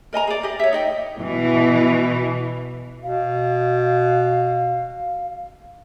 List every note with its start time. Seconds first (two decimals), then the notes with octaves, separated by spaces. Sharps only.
0.13 A#4 D#5 G#5 A#5
0.27 G#4 D5
0.43 G4 D#5
0.59 C#5 E5
0.73 D#4 D#5 G5
1.18 B2 E3
3.03 B2 F5